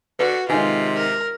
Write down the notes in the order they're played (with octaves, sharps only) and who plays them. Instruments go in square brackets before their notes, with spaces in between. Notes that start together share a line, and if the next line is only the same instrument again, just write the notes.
[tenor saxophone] D3 [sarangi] F#4 [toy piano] B4
[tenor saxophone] C3 [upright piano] D#3 G#3 [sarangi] F4 [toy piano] F5 G#5
[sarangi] A#4